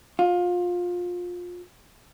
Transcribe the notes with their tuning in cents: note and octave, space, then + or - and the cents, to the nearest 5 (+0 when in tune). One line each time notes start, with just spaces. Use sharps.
F4 +25